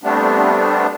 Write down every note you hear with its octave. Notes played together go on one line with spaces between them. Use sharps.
G3 A3 B3 C4 D4